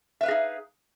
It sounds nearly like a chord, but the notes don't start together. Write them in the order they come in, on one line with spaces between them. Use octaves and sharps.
E5 B4 F5 G#4 D#4